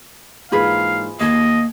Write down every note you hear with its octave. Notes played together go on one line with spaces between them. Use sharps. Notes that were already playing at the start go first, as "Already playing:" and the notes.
G#2 E3 A#3 F4 G#4 B4 F5
D#2 A#3 D#5 G#6